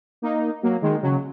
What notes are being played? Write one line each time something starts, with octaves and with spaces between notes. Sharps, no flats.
A#3 D#4
F#3 A#3
D#3 G#3
C#3 F#3